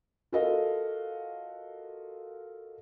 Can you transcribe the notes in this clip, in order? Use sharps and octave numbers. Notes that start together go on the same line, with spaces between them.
F4 F#4 A4 A#4 D#5 F5